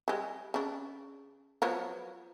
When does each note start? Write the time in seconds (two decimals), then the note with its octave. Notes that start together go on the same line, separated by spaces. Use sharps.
0.08 G3 G#3
0.54 C#3 D4
1.62 F3 F#3 B3